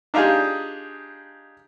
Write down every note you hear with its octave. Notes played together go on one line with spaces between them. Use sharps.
D4 D#4 F4 G4 G#4